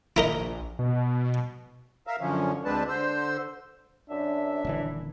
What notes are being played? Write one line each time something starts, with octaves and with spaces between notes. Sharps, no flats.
A#1 E4 A#4 D#5
B2
A#4 E5 F5
F#2 D3 F3 C#4
D2 G#3 C4 D4 B4 A5
D3 C5 E6
F#2 D4 E5
D#1 D3 E3